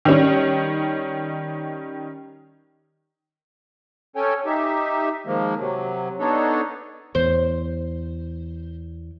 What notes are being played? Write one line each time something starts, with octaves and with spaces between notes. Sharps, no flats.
D#3 G3 C#4
C#4 A4 C#5 G5 G#5
D#4 G4 E5
D#3 F3 G#3 A#3
C3 F#3
B3 D4 D#4 A4 C#5
E2 C5